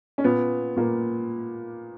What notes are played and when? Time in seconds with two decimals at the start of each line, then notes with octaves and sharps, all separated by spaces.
0.18 C#4
0.24 A#2 B3
0.77 A#2 A#3